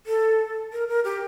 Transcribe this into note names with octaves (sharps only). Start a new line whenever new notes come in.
A4
A#4
A#4
G4